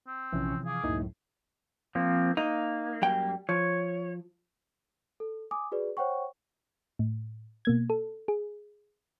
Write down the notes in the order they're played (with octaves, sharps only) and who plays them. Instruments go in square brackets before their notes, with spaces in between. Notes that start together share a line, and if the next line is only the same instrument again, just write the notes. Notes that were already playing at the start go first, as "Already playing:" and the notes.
[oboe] C4
[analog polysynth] A#1 C#4 C#5 [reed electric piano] C3 E3 F3
[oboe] G#4 [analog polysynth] F5 D6
[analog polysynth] C#2 F#2 A2 [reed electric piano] A#3 D#4 E4
[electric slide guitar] F3 A#3 C4
[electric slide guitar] A#3 [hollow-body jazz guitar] D#4
[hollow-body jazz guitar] F#2 G3 G5
[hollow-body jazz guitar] F3 [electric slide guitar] C#5
[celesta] A4
G#5 D6 D#6
F#4 G#4 B4 D5
C5 C#5 F#5 G5 C#6
[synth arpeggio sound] A2
B2 A#3 G#6
A4
G#4